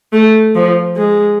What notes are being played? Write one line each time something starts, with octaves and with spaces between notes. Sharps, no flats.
A3
F3
G#3